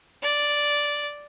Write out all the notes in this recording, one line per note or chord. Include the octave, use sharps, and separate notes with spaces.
D5